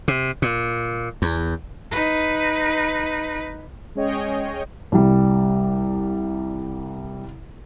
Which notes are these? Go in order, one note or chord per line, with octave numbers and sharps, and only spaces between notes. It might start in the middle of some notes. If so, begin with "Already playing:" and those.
C3
A#2
E2
D#4 B4
G#3 C#4 G#4 C#5 D#5 G5
C2 G3